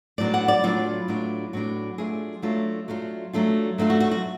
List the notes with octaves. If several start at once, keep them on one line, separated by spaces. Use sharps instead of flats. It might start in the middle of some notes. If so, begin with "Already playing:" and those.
A2 F#3 B3 D4 D5
F#5
D5
A2 F#3 B3 D4 F4
A2 F#3 B3 D4
A2 F#3 B3 D4 F#4
F#3 A3 D4 F4 G#4
F#3 A3 D4 F4
F#3 A3 D4 F4
F#3 A3 D4 F4
F#3 A3 D4 F4
F#4
F#4
F#4